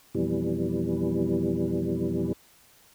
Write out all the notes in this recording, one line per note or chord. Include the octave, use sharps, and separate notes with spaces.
F2 B2 E3 G3